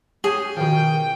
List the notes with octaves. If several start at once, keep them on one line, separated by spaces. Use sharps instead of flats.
C#4 G4 G#4
B2 D#3 F3 G5